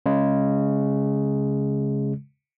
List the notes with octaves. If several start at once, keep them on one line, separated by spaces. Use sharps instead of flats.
C#3 G#3